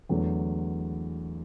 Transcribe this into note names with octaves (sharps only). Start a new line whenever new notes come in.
E2 D3 F#3 A3